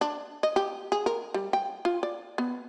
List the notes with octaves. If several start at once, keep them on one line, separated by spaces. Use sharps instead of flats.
D4
D#5
G4
G#4
A#4
G3
G5
F4
D5
B3